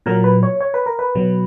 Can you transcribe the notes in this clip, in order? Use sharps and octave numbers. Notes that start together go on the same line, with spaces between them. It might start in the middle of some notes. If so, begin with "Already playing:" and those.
A#2 F#3 A#4
B4
C#5
C#5
B4
A#4
B4
B2 F#3